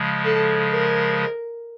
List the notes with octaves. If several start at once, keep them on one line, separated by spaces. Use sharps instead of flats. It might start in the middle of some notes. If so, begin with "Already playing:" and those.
Already playing: C#3 F3 G#3
A4
A#4